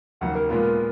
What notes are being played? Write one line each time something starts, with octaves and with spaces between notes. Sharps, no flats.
D#2 C#3 F#3 A#3 F#5
A#4
A#2 G#3 B3 F4 A#4